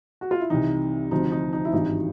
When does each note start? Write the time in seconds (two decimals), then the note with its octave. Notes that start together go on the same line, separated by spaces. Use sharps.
0.21 F#4
0.31 F4
0.40 E4
0.50 C2 C3 E3 D#4
1.11 D2 C3 F3 D#4
1.32 D#4
1.53 D#4
1.65 E4
1.73 G#1 G2 E3 D#4